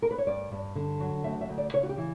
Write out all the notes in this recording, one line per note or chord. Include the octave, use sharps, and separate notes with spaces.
A#4
B4
C#5
G2 D5
G2
D3
F#3
D2 E5
E5
D2
D5
C#3 C#5
F#4
G4
E3